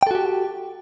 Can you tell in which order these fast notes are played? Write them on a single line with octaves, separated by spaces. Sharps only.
G5 A4 F#4 G4